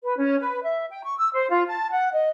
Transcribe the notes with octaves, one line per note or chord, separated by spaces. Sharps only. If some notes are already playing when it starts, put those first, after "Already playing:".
B4
C#4
B4
E5
G5
C#6
E6
C5
F4
A5
F#5
D#5